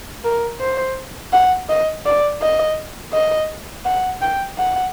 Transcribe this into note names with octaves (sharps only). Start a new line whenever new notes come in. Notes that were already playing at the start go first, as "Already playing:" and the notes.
A#4
C5
F#5
D#5
D5
D#5
D#5
F#5
G5
F#5